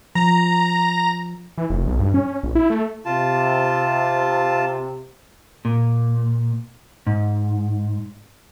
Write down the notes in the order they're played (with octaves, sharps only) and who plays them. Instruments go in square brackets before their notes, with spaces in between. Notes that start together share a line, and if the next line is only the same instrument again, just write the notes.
[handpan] F3 [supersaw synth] A#5
[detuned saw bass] E3
F1
B1
G2
C#4
A#1
E4
A3
[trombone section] C3 [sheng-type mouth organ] F4 A5
[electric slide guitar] A#2
G#2